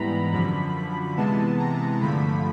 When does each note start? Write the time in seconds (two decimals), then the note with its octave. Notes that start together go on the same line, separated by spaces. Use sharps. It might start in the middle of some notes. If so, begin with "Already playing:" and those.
Already playing: G#2 E3 G3 B3 A#5 B5
0.32 F#2 D3 F3 B5
1.16 C3 E3 G#3 B3 A5
1.59 A#5
2.01 G2 D3 F3 A3 B5